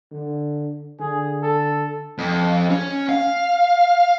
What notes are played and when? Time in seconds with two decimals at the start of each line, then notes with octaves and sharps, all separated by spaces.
0.12 D3
1.00 D3 G#4
1.43 A4
2.18 F2
2.70 C#4
3.09 F5